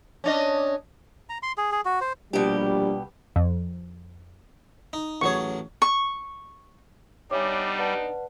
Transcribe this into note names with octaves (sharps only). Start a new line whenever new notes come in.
C#4 D4 D#5
A#5
C6
G#4
G#4
F#4
C5
A#1 B2 G3 G4
F2
D#4
A1 F#3 G#4 C#5 C#6
C#6
G3 B3 D4 D#4 C#5 E5 G#5 D6
B4 D5 F#5 A5